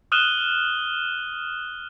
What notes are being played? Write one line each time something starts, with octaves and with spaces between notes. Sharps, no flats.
D#6 F6 F#6 D#7 E7 G7